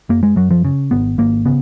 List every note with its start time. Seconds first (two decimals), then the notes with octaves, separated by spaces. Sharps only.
0.09 F#2 A#3
0.23 G#3
0.36 F#2 F#3
0.51 F3
0.65 C#3
0.91 G#1 B3
1.18 G#1 A#3
1.46 C#3 B3